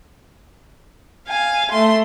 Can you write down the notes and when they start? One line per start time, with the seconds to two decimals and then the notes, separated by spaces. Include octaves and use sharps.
1.29 F5 G#5
1.72 A3 C6